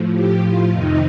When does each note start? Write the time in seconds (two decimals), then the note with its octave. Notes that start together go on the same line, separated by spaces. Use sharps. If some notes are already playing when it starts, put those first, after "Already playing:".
Already playing: A2 F3
0.12 G4
0.41 F4
0.71 F2 C3 D#3 D#4